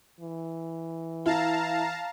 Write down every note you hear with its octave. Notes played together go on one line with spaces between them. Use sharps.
E3
E4 F5 A5 A#5